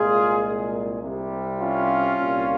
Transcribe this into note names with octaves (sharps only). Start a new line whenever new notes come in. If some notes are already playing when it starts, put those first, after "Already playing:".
Already playing: C2 A#2 G#3 F4 G#4
C2 C3 G3
C#4 F4
C2 A#2 G3